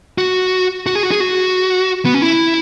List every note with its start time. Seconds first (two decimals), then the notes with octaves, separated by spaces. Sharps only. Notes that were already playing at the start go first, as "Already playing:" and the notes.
0.18 F#4
0.86 F#4
0.95 G#4
1.03 F#4
1.12 G#4
1.20 F#4
2.05 B3
2.14 C#4
2.22 E4